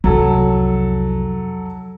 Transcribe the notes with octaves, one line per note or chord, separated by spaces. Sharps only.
C2 F2 F#3 A4